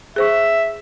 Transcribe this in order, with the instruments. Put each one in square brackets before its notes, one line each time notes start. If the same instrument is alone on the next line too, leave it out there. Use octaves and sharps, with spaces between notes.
[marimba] G#4 C5 C#6 [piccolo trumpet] E5